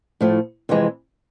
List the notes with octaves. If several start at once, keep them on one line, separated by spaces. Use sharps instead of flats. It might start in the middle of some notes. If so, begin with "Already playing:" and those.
A2 F3 A3
F2 C3 E3 G#3